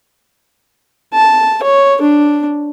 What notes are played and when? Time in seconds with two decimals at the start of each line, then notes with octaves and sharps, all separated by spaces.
1.14 A5
1.63 C#5
2.02 D4